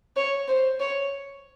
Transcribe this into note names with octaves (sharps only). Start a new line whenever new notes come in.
C#5
C5
C#5